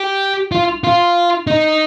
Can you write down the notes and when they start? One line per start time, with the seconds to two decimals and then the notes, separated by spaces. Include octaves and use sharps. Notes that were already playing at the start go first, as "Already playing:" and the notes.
Already playing: G4
0.52 F4
0.84 F4
1.47 D#4